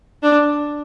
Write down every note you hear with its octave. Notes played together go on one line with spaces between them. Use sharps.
D4